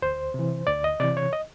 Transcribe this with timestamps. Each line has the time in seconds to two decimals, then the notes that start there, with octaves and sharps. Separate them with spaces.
0.02 D2 C5
0.34 C3 E3
0.67 D2 D5
0.84 D#5
1.00 C3 E3 D5
1.17 C#5
1.33 D#5